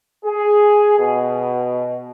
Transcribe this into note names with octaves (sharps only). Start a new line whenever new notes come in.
G#4
B2